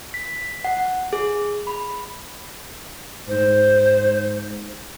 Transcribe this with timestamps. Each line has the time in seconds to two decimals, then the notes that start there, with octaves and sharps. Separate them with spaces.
0.14 B6
0.65 F#5
1.13 G#4
1.67 B5
3.29 G#2 C5